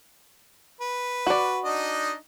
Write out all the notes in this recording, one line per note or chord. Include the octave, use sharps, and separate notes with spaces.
B4
F#4 D5
D4 D#4 D#5